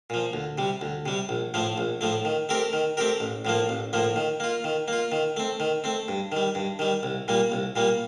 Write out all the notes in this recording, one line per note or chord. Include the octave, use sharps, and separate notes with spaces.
A#2 F3
D2
C3 G3
D2
C3 G3
A#1
A2 F3 A3
A#1
A2 F3 A3
D#3
A3 C4 G4 A#4
D#3
A3 C4 G4 A#4
A1
A2 F3 A#3
A1
A2 F3 A#3
D#3
A#3 F4
D#3
A#3 F4
D#3
A3 C4
D#3
A3 C4
G2
D#3 G3
G2
D#3 G3
C2
A#2 G3 A#3
C2
A#2 G3 A#3